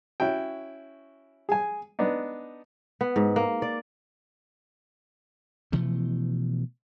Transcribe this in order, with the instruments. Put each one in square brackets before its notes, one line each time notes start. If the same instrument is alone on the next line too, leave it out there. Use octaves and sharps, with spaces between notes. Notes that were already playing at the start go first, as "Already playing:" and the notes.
[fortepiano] C#4 E4 F#4 G5
G#4 G#5
B3 D4 D#4
[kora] B3
G#2
A#3
D5
[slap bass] B2 E3 F3 A3